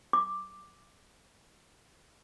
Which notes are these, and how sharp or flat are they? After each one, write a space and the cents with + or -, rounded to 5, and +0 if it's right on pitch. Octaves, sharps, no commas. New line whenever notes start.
D6 +5